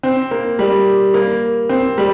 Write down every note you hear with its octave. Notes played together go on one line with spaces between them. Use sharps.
C4
A#3
G3
A#3
C4
G3